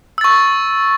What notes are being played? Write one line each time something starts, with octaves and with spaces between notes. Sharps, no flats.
C#6 E6 A6